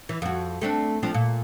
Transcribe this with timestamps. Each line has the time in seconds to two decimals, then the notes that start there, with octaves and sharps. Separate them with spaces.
0.09 E3
0.22 F2 F#4
0.61 A3 C4 D4
1.03 F3 C4 D4
1.14 A#2